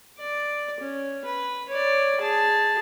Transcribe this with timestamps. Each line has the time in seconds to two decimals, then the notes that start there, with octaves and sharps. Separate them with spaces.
0.19 D5
0.80 C#4
1.25 B4
1.69 C#5 D5
2.20 G#4 A5